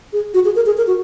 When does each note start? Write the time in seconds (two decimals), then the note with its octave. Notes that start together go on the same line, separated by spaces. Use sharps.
0.13 G#4
0.34 F#4
0.45 G#4
0.56 A#4
0.66 G#4
0.77 A#4
0.87 F#4